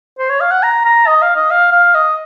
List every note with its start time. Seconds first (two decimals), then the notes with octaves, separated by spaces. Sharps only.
0.18 C5
0.30 C#5
0.40 F5
0.51 F#5
0.63 A#5
0.85 A#5
1.07 D#5
1.22 F5
1.36 D#5
1.50 F5
1.72 F5
1.95 D#5